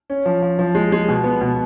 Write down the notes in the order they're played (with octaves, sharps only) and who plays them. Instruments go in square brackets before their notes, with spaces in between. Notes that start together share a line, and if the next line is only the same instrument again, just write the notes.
[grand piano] C#4
F3
F3
F3
G#3
G#3
B2
B3
B2